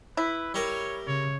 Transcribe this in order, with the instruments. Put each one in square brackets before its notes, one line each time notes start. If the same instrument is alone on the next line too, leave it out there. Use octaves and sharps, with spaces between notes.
[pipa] E4 [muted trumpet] B4
[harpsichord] G3 A#4 [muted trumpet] C#5
[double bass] C#3 [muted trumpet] C#5